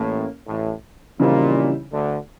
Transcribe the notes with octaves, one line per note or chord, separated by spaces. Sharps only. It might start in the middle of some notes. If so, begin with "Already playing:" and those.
Already playing: A1 A2 A#3 C#4
A1 A2
A#1 A#2 C#3 E3 G3 C4 D#4
D2 D3